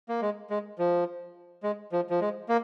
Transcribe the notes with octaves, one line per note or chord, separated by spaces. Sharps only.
A#3
G#3
G#3
F3
G#3
F3
F3
G#3
A#3